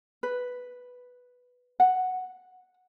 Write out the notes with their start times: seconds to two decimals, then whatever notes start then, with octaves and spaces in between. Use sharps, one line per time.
0.23 B4
1.80 F#5